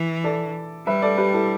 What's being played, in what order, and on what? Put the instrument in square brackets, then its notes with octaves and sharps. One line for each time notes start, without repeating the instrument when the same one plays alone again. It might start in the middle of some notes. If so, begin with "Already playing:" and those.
Already playing: [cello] E3 [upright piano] E4
[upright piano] A4 D5
[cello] G3 [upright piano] B4 E5
[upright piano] A4 D5
G4 B4
E4 A4